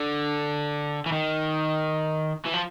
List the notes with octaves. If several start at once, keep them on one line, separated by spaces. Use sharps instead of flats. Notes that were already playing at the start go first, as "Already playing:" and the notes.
Already playing: D3
E3
D#3
E3
F3